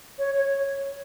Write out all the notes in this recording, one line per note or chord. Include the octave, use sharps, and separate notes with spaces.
C#5
C#5